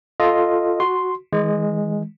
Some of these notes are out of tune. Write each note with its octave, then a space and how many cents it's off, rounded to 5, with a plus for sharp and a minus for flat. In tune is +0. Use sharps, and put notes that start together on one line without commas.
F4 +0 A4 +0 D#5 +0
F#4 +0 C6 +0
E3 -40 G#3 +0